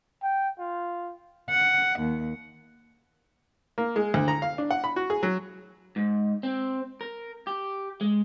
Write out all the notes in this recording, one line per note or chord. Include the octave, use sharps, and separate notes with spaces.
G5
F4
F#5
D#2
A#3
G#3
D2
A#5
F5
D4
F#5
B5
F#4
G#4
F#3
G#2
C4
A#4
G4
G#3